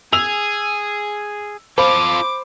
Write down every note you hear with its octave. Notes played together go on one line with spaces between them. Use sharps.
G#4 E6 F7
F4 A4 C5 B5 D6